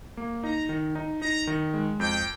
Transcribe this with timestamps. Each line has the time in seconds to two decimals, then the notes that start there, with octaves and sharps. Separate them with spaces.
0.17 A#3
0.44 D#4 A#5
0.69 D#3
0.95 D#4
1.21 D#4 A#5
1.47 D#3
1.74 G#3
2.00 F2 G5